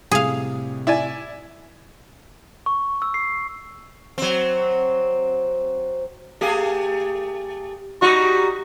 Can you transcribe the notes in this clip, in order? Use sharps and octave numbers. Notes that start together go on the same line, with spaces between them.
A2 C3 G3 G#4 F5
E4 D5 G#5
C#6
E6
C7
F#3 C4
A3 G4 G#4
G3 D#4 F#4